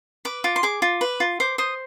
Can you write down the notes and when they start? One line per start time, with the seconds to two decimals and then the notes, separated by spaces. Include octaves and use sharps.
0.25 B4 D6
0.44 F4 D6
0.56 C6
0.63 G#4 D6
0.82 F4
1.01 B4
1.20 F4
1.40 C5 D6
1.58 C5 D#6